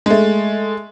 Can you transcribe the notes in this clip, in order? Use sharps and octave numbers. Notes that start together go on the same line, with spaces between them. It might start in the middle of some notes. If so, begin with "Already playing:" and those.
G#3 A3